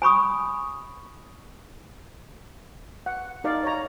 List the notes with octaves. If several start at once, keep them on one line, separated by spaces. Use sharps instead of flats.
G#5 B5 C#6 D#6
F#5
D#4 A#4 D5 F5
C#5 A#5